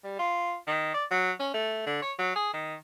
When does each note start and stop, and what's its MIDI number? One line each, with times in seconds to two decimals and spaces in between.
0.04 0.15 55
0.19 0.56 65
0.67 0.92 51
0.94 1.05 74
1.11 1.32 54
1.40 1.51 61
1.54 1.86 57
1.87 1.99 50
2.02 2.12 73
2.19 2.32 54
2.36 2.51 68
2.54 2.75 51